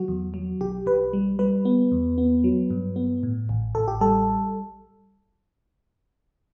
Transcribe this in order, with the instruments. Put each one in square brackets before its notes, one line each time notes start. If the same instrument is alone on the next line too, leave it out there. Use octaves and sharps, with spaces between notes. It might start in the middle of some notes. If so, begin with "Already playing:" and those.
Already playing: [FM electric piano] F#3 F#4
E2
F#3
B1 G4
B1 B4
G3
G3 B4
B3
E2
B3
F#3
G2
B3
A2
A1
A1 A4
G4
G3 A4